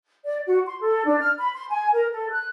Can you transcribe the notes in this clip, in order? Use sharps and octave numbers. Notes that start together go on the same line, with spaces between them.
D5
F#4
C6
A4
D4
F6
B5
C6
G#5
A#4
A4
F#6